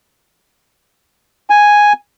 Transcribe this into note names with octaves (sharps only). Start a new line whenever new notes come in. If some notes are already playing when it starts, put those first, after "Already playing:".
G#5